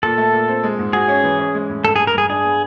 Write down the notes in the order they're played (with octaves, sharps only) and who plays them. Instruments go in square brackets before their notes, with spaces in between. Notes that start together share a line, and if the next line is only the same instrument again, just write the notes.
[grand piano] A#2 [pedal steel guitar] A4
[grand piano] A3
A#2
C4
G#3
G#2
[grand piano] F#4 [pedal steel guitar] G#4
[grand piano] C#4
E3
C#4
G#3
A2
[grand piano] G2 [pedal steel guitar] A4
[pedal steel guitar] G#4
[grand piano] G3
[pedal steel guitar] A#4
[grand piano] G2 [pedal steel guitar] G#4
[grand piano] D4 [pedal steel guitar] G#4
[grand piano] B3